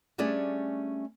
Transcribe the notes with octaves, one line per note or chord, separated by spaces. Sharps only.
G3 A3 C#4 D4 G#4 D5